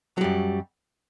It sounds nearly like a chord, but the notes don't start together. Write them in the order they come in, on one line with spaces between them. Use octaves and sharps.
F#3 G3 F#2